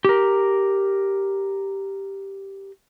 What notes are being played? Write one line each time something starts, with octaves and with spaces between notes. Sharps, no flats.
G4 A#4